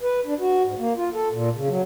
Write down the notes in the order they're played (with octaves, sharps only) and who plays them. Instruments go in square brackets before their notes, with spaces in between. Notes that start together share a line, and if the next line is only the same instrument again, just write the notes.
[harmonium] B4
D4
F#4
G#2
A#3
F4
A4
A#2
C#3
F#3